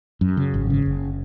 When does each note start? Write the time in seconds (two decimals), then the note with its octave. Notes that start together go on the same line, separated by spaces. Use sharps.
0.21 F#2
0.37 C#3
0.54 G#1
0.70 C#3
0.86 F#1